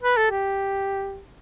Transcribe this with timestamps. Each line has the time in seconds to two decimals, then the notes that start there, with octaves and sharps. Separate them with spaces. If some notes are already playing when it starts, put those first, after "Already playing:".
0.03 B4
0.17 A4
0.31 G4